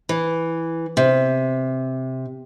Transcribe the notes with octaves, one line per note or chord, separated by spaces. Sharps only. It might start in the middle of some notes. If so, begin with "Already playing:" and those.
E3
C3